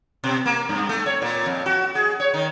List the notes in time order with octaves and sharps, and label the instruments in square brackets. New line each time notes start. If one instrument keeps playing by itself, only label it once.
[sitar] B2
A#3
G2
A3
C#5
A#2
F2
F#4
G#4
C#5
D#3